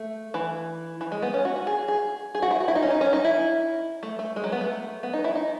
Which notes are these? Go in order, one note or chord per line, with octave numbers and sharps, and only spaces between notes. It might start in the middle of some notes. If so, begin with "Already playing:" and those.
Already playing: A3
E3
E3
G#3
B3
C#4
F#4
F#4
G#4
G#4
G#4
F#4
E4
F#4
E4
D#4
C#4
D#4
C#4
D#4
E4
A3
A3
G#3
F#3
B3
A3
B3
D#4
E4
D#4